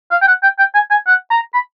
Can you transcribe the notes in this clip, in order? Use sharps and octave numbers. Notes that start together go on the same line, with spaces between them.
F5
G5
F#5
G5
G5
G#5
G#5
F#5
A#5
B5